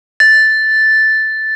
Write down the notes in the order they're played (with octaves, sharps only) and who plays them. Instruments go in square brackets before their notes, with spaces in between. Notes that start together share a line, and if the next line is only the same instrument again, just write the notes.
[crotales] A6